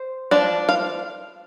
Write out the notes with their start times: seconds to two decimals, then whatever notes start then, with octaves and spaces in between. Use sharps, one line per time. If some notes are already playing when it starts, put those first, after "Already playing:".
Already playing: C5
0.31 F3 D4 D5
0.69 F5